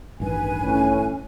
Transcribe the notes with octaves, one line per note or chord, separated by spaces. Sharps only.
A1 G2 D#3 B4 G#5
A2 C#4